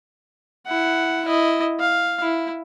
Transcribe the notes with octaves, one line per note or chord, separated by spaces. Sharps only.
E4 F#5
E4 D#5
F5
E4